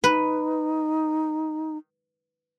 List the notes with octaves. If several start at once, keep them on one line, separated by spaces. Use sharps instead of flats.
D#4 B4